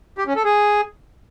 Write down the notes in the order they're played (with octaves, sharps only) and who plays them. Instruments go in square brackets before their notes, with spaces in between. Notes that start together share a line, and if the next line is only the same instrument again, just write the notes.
[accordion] G4
C#4
A4
G#4